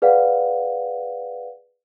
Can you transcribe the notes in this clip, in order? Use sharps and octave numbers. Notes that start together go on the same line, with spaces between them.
G#4 B4 D5 F5 F#5